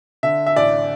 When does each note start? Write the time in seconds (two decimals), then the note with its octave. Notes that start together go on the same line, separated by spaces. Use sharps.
0.23 D3 E5
0.46 E5
0.56 A1 D5